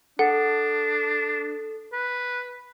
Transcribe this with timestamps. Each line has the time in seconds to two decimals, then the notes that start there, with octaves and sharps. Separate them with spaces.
0.19 D4 A4 F#5
1.93 B4